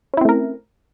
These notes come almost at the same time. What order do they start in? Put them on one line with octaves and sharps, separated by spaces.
C#4 E4 C4 A3 A#4